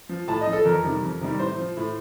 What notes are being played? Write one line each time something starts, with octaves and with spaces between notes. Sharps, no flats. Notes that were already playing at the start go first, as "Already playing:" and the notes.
F3
A2 A5
D#5
F3
A4
F2 A#4
C3 D#3 G3
F2
C3 D#3 G3
A2 C5
F3
A2